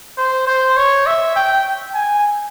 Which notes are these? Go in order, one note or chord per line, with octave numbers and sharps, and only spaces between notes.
C5
C5
C#5
E5
G5
G#5